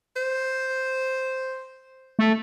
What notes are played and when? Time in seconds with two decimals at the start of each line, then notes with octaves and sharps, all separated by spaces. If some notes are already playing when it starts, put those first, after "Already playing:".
0.16 C5
2.19 A3